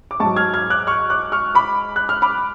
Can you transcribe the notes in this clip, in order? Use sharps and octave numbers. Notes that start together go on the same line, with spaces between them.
D6
G#2 F#3 A5 C#6
F6 G#6
F6 G#6
D6 F#6
C#6 F6
D6 F#6
C#6 F6
B5 D6
F#6
F6
B5 D6